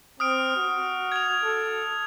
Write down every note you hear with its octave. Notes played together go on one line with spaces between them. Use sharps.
C4 D#6 F6 D7
F#4
G#6 F7
A4